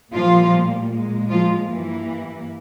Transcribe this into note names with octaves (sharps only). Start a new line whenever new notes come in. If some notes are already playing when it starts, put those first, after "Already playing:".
A#2 F3 G3 A#3 F4
A#2 G#3
F3 F4
G2 E3 A#3